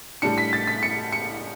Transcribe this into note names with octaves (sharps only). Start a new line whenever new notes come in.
A2 G3 D4 C#7
B6
A6
B6
C#7
C#7